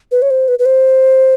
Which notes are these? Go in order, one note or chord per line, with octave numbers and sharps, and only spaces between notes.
B4
C#5
C5
B4
B4
C5